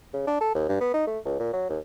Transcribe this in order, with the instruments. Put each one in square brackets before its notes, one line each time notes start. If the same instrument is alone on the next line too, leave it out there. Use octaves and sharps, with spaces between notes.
[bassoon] C#3
D4
A4
D#2
G2
B3
D#4
A3
C#2
A#2
F#3
D#2